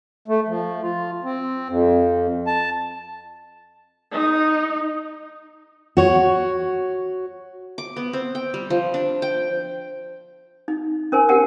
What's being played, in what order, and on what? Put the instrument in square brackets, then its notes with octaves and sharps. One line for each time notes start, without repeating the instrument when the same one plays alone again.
[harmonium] A3
F3
F4
C4
F2
A5
[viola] D#4
[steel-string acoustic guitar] F#4 C#5
[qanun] D6
B3
C4
G5
G3
F3
D4
G5
[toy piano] D#4
C#4 A#4 C5 G#5
G4 A#4 F#5 G5 A5